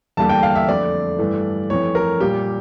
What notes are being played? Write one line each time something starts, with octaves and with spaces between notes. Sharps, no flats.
E2 D3 G3 A#3 A5
G5
F5
E5
F2 D3 A3 D5
G2 E3 A3
F2 E3 A3 C#5
A#4
A#2 G3 A#3 G4